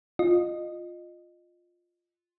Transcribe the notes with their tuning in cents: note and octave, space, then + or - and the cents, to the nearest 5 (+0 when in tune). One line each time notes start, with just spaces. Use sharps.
F4 +5 D#5 -20